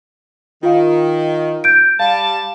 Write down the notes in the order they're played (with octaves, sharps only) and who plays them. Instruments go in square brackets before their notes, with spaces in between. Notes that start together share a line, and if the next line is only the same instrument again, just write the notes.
[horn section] D#3 [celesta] F4 F5
[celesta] G6 D7
[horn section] G3 A5 [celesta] F5